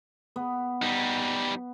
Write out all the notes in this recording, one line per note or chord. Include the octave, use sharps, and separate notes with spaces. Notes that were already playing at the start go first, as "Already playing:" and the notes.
B3
G3 D#4